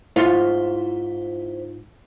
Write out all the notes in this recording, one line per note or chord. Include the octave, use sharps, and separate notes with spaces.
G#2 E4 F4 C5 C#5